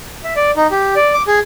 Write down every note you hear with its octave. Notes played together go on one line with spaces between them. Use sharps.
E5
D5
D#4
G4
D5
D6
G#4